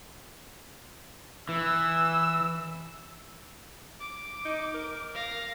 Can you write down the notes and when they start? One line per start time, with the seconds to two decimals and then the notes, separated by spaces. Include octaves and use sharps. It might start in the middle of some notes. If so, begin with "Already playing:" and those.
1.49 E3 E6
4.00 D6
4.45 D#4
4.74 A#4
5.15 F5 A#6